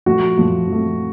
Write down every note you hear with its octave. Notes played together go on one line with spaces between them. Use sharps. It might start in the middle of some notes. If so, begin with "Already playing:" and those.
A#2 F3 A3 F#4
A#2 F3 A3
A#2 F3 A3